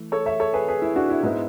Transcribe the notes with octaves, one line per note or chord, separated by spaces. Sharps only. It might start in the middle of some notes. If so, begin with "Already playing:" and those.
Already playing: E3 A3
A4 C#5
C#5 E5
A4 C#5
G#4 B4
G#4 B4
E4
D4 F#4
E4
G#2 G#3 B3 E4